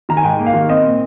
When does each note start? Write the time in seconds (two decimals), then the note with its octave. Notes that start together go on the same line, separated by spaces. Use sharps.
0.09 D#3 A#5
0.17 G#5
0.23 G#2 G5
0.39 A#3
0.46 F5
0.54 D#3
0.69 C4 D#5
0.84 A#2